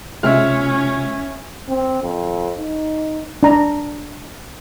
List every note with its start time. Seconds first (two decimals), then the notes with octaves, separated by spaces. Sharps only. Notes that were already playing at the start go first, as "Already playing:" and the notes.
0.23 C3 G#3 C#4 F4 E5 F6
1.69 C4
2.03 F2
2.59 D#4
3.43 D4 A#5